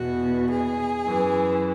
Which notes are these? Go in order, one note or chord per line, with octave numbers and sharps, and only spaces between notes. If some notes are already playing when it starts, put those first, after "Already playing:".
Already playing: E2 B2 F#4
G#4
F#2 E3